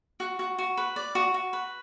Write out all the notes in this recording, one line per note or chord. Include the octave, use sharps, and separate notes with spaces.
F#4
F#4
F#4
B4
D5
F#4
F#4
B4